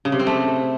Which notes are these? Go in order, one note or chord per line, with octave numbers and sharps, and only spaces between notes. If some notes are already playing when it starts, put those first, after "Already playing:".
C#3
C3
C4
A3